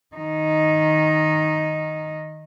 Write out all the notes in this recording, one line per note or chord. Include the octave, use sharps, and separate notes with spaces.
D#3 D#4